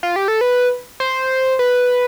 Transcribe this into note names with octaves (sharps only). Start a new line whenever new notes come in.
F4
G4
A4
B4
C5
B4